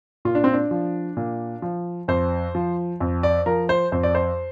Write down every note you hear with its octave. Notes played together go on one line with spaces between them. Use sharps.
A#2 F4
D4
C4
D4
F3
A#2
F3
F2 C5
F3
F2
D5
F3 A#4
C5
F2 C5
D5
C5